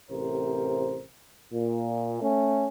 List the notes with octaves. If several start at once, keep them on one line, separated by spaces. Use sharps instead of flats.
A1 C3 A#4 C5
A#2
A3 C#4